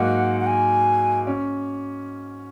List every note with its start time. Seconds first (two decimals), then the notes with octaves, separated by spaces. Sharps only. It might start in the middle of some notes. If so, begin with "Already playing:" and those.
Already playing: G#2 F#3 A#3 D#4 F#4 F#5
0.40 F#5
0.47 G#5
1.27 C#4